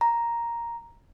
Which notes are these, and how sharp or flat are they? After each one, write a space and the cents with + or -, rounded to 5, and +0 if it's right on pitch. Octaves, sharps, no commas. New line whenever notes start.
A#5 +5